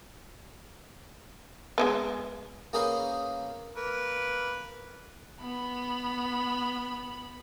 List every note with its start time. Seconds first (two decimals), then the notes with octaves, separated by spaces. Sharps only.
1.78 G#3 A#3 B3
2.73 A#3 C#4 G#4 B4 C5 F5
3.76 A#3 B4
5.40 B3 B5